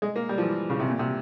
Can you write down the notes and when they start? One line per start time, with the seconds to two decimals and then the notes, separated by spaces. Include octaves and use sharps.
0.02 G#3
0.16 A#3
0.29 G3
0.38 F3
0.43 E3
0.70 C#3
0.80 C3
0.90 A#2
0.99 C3